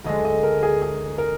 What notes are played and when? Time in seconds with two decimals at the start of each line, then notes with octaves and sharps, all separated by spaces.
0.04 D2 D3 G#3 D4 D#5
0.25 D#5
0.43 A#4
0.63 G#4
0.82 G#4
1.18 A#4